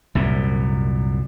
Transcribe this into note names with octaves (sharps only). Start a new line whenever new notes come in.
C2 F#2 A#2